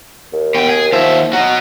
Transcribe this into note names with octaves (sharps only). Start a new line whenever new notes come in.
D#2
B2 G5
G#4
D#2 F3 E5
F#3 F#4 D#5